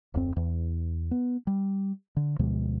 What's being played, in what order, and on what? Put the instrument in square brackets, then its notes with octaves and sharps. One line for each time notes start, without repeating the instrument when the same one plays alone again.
[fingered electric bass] D1 F2 C4
E2
B3
G3
D3
D2 B2 F3 G#3